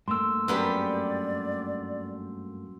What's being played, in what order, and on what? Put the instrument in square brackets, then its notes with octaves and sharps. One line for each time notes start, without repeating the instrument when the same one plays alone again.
[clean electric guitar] G2 A3 A#3 [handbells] C6 E6
[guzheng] F#2 B3 G4 [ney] D5